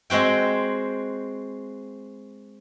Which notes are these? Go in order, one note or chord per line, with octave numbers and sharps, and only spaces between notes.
G#3 C4 F#4 G5